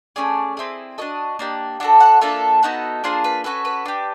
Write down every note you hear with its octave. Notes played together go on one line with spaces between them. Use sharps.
A3 C#4 G#4 D5
C4 E4 G#4
D4 F#4 A4 D#5
A#3 D4 G4
D4 F#4 A4 F#5
F#5
A#3 D4 F4 A4 E5
B3 D#4 F#4 A4
A#3 D4 F4 G#4 C5
B4
C#4 F#4 A4 B4
B4
D4 G4